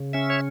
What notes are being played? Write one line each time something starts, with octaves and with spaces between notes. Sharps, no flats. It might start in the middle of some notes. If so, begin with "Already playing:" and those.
Already playing: C#3
C#4 E5
C#5